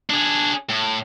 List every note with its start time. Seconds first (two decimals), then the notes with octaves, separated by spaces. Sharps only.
0.10 D4 G#4
0.69 A2